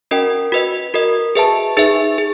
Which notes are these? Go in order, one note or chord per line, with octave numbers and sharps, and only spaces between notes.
C#4 F#4 A#4 D#5 G5
F#4 B4 D#5
F#4 A#4 D#5
G#4 B4 E5 A5
D#4 G#4 B4 E5
G#4